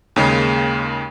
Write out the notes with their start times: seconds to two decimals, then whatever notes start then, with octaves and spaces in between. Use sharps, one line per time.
0.16 D#2 C#3 G#3 A#3